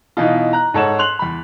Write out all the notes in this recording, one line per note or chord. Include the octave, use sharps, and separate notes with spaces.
B2 E3 D#4 F4
A#5 F#6
G#2 A4 C#5 F#5 E7
C6 F#6 F7 F#7
E2 B5